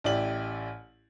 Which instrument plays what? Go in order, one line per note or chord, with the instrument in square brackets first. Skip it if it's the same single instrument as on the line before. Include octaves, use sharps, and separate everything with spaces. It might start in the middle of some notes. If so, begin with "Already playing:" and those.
[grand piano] A1 E4 G4 D5 F#7